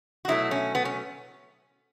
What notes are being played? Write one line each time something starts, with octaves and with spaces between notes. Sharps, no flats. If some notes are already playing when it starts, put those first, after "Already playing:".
F#4
B2 F#3 A3 E4
C#4
B3
C#4